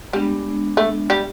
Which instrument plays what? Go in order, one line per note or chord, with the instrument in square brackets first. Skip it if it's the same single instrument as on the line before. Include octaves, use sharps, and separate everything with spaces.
[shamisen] G3 [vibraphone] G#3 B3 D4
[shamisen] A3
G3